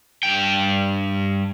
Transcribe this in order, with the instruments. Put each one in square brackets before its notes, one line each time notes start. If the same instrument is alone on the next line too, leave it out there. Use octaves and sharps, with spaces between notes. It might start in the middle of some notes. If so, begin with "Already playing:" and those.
[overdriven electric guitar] G2 G5